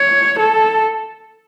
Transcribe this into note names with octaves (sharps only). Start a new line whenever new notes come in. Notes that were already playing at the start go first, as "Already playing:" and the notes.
Already playing: C#5
A4